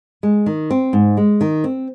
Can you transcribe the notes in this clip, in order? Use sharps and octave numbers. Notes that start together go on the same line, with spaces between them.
G#3
D#3
C4
G#2
G#3
D#3
C4